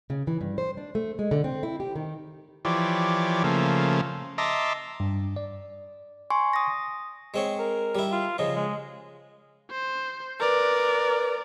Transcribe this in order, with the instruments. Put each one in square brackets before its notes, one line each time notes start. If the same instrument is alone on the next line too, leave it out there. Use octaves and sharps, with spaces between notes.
[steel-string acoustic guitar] C#3
E3
G2
C5
D4
A3
G#3
D3
C4
E4
G4
D#3
[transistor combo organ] E3 F3 G4 C#5 D5
C#3 F3 A3 A#3
D#5 E5 A5 A#5 C6 D6
[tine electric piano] G2
D5
[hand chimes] G#5 C6 C#6
D#6 A#6
[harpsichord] G#3 C4 C#5
[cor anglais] A#4
[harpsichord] G3 E4
[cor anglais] F4
[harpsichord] C#3 F3 [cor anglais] D#5
[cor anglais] G#3
[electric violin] C5
[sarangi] A#4 [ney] B4 [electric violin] D5